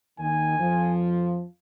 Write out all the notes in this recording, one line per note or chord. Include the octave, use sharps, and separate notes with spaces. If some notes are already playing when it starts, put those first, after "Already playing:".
D#2 D#3 G#5
F2 F3